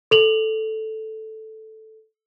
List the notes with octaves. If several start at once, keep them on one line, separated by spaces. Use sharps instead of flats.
A4 F7 F#7